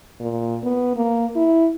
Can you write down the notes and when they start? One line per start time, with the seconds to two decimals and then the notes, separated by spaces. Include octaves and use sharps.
0.20 A#2
0.63 B3
0.96 A#3
1.36 E4